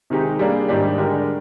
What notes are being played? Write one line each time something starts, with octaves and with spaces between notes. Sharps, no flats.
C3 D#3 G#3 D#4 G4
G3 A#3 D4 G#4
G#2 D#3 G3 D4 G4
D3 G#3 D4 G4 A#4